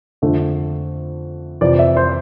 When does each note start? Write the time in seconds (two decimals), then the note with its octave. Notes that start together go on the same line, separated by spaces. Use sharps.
0.22 F2 D3 A3
1.61 F2 C3 E3 D5
1.79 E5
1.97 C5